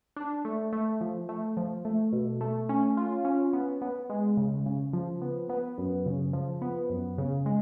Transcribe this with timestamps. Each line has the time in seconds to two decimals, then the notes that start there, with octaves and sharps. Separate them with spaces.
0.16 D4
0.45 A3
0.73 A3
1.01 F3
1.29 A3
1.57 F3
1.85 A3
2.13 B2
2.41 A3
2.69 C#4
2.97 F4
3.25 C#4
3.53 B3
3.82 B3
4.10 G#3
4.37 C#3
4.66 C#3
4.93 F3
5.22 B3
5.49 B3
5.78 F#2
6.06 C#3
6.33 F3
6.62 B3
6.90 F#2
7.18 C#3
7.46 G#3